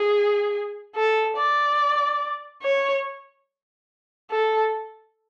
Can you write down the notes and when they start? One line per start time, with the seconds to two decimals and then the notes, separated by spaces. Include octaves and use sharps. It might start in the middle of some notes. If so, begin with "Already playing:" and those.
Already playing: G#4
0.96 A4
1.37 D5
2.63 C#5
4.31 A4